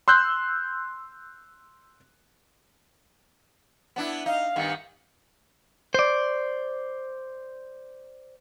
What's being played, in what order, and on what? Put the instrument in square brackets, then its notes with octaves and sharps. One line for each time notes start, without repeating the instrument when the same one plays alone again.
[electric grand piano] C6 E6 F#6 G6
[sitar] B3 D4 E4
[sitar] D#4 [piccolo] F5
[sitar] G2 D#3 B3
[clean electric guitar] C5 D5